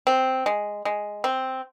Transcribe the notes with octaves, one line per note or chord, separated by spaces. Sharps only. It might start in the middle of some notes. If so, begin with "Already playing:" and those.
C4
G#3
G#3
C4